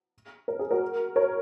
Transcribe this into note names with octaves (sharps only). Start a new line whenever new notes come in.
A#4
G#4
F#4 A#4
A#4 C#5